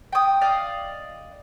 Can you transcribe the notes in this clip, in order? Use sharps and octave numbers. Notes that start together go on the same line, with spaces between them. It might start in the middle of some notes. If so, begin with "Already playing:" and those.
G5 D#6
D5 D#5 F5